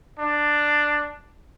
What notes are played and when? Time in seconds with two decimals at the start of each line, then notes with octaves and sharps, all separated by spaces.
0.19 D4